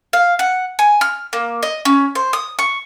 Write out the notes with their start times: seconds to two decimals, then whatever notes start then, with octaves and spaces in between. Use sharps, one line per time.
0.13 F5
0.39 F#5
0.79 G#5
1.01 F6
1.33 A#3
1.63 D#5
1.85 C#4
2.15 C5
2.33 D#6
2.59 C#6